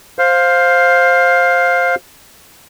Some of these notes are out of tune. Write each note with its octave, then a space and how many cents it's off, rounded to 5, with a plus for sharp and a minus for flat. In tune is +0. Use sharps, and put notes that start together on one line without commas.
C5 +5 F5 +10